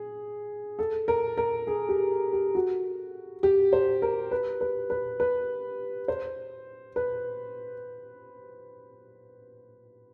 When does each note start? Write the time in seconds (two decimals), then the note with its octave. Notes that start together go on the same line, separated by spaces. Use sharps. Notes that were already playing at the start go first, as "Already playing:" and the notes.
Already playing: G#4
0.79 A4
1.08 A#4
1.37 A#4
1.67 G#4
1.89 G4
2.33 G4
2.55 F#4
3.43 G4
3.73 C5
4.02 A#4
4.31 B4
4.61 B4
4.90 B4
5.20 B4
6.08 C5
6.96 B4